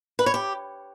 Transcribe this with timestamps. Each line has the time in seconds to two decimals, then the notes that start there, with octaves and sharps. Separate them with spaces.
0.19 B4
0.26 C#5
0.34 G4